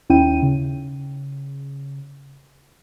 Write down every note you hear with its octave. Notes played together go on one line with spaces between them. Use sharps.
D#2 C#4 D#4 E4 G5 D#7
C#3